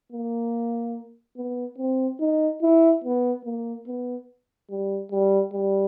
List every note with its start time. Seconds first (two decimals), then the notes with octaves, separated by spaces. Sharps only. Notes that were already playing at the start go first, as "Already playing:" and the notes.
0.12 A#3
1.37 B3
1.78 C4
2.20 D#4
2.63 E4
3.04 B3
3.45 A#3
3.87 B3
4.70 G3
5.12 G3
5.53 G3